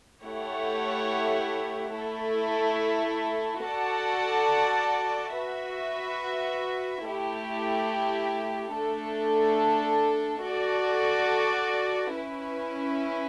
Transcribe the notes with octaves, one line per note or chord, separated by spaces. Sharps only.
A3 E4 G4 C#5 F#5
A3 E4 A4
F#4 A4 D5 F#5 A5
F#4 B4 E5
A3 E4 G4
A3 D4 A4
F#4 A4 D5
C#4 E4 B4